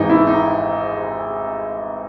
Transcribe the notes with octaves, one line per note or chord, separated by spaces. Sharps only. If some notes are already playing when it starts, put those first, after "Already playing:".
Already playing: G#1 G#2 E3 D#4
E4
D#4